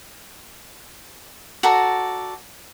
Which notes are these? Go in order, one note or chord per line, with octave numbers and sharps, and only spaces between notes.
F#4 A4 D5 A#5